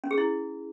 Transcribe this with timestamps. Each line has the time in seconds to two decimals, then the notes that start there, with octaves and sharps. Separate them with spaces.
0.04 C#4
0.11 G#4
0.18 E4